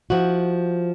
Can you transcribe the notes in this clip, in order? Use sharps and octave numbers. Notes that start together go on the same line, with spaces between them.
F3 E4 F#4